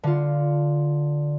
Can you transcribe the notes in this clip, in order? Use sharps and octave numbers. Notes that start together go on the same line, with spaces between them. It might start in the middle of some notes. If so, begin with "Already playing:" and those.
D3 F4